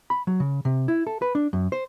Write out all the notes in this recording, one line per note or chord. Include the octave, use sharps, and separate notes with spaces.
B5
F#3
C#3
C3
E4
A4
B4
D4
F#2
C5